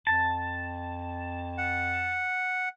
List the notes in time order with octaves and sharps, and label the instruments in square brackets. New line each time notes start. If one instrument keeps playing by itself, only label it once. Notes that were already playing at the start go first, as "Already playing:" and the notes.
[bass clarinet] F2 [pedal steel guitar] A5
[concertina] F#5